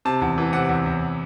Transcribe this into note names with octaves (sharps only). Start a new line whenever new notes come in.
C3 A5
E2
E3
C3 F#5
E2
E2